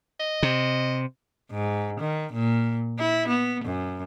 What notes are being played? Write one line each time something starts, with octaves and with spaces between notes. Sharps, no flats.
D#5
C3
G#2
D#3
A#2
E4
B3
F#2